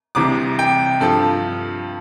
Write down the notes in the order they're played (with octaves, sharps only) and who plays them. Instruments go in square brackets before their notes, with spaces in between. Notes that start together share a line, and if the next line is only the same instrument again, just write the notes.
[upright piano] C2 C3 E3 D6
G5
G2 F3 A4